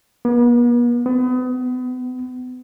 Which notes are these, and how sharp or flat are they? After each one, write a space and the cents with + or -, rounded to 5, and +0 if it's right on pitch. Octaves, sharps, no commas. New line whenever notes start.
B3 -45
B3 +35